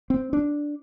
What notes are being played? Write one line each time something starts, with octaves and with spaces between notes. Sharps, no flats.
C4
D4